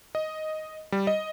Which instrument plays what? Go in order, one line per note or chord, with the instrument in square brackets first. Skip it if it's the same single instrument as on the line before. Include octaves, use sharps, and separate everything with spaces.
[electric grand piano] D#5
G3
D#5